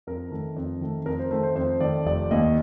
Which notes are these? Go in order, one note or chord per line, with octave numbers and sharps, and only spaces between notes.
F2 A#4
D#3 A3
F2
D#3 A3
F2 A#4
C5
D#3 A3 C5
C5
F2 C5
D#3 A3 D5
F1 D5
D#2 D#3 A#3 D#5